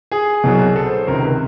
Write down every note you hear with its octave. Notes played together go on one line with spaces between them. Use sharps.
G#4
C2 B2 F#3
A4
C5
C5
C#2 C3 D#3 A#4
B4